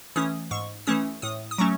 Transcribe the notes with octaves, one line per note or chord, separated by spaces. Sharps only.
E3 A3 C#4 D#6
G#2 C#6
E3 A3 C#4 D#6
A2 D#6
D#6
F#3 A3 C#4 C#6